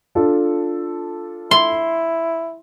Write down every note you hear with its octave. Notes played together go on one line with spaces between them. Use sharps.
D4 F4 A4
E4 C6